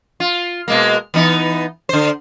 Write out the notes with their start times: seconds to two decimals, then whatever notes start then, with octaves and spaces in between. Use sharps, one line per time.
0.20 F4
0.68 B2 G#3 A#3
1.14 E3 B3 D#4
1.89 D3 C5